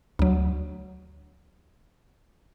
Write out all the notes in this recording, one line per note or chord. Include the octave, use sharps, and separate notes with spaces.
D2 F#3